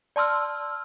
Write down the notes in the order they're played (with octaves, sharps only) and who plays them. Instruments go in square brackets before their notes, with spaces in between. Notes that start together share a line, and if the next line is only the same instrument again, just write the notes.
[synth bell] D5 A5 C6 E6 F6